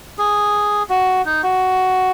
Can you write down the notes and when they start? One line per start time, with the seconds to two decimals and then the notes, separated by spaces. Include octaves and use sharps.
0.18 G#4
0.90 F#4
1.26 D#4
1.43 F#4